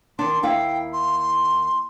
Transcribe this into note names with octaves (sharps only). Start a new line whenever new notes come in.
D#3 D4 C6
D#2 E4 F5 G5
C6